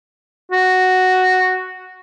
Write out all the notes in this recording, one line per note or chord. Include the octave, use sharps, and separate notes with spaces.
F#4